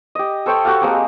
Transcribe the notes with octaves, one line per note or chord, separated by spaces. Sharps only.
G4 D#5
A4 C5 C#5 G5
F#4 G4 A4 F5
G#3 A#3 C4 G4